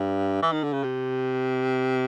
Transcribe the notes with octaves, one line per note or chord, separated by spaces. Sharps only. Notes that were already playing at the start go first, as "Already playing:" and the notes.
Already playing: G2
E3
D#3
D3
C#3
C3